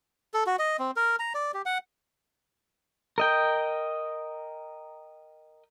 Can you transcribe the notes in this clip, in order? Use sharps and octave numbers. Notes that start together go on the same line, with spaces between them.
A4
F#4
D#5
C4
A#4
A#5
D5
G4
F#5
A#4 D#5 G5